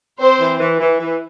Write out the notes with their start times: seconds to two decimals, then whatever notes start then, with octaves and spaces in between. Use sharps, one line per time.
0.20 C4 C5
0.40 E3
0.60 E3
0.80 E3
1.00 E3